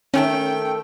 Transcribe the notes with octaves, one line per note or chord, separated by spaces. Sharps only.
D#3 A3 C#4 A4 G5